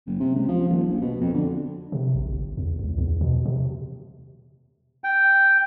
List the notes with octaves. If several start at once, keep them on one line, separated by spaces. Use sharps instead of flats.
F#1
C3
C#2
F3
D#1
A#1
B2
F2
D3
C3
A1
G1
E2
C#2
E2
B2
C3
G5